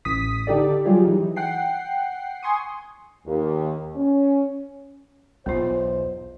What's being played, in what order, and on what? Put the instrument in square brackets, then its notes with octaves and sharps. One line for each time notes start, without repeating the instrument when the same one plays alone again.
[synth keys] A1 D#6 B6
D3 D#4 G4 A4 D5
F#3 G3 F4 G4 G#4
E3 D#4
F#5 G5 C7
G#5 C6 C#6 D#6
[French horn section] D#2
C#4
[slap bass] B1 E2 G#2 [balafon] B3 F4 [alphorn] C5